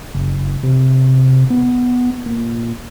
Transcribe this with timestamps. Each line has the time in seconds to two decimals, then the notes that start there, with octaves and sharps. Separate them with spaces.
0.15 F#1
0.63 C3
1.50 B3
2.26 A#2